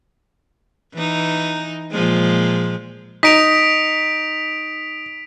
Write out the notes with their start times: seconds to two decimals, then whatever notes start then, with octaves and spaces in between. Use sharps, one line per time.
0.93 E3 D#4
1.91 A#2 F3 G#3
3.23 D#4 B6 D7 F7